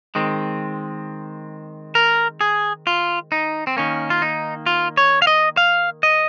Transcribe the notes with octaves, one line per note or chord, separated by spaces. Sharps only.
D#3 G#3 C4
A#4
G#4
F4
D#4
C4
D#3 A#3 C#4
F4
D#4
F4
C#5
F5
D#5
F5
D#5